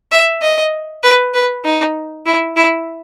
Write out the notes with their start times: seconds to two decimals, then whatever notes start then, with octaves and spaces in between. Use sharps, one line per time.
0.12 E5
0.42 D#5
1.03 B4
1.34 B4
1.64 D#4
2.26 E4
2.56 E4